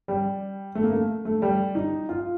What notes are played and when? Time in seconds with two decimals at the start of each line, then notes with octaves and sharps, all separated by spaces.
0.08 G3
0.75 A3
0.83 A#3
0.91 A3
1.25 A3
1.42 G3
1.75 D#4
2.09 F4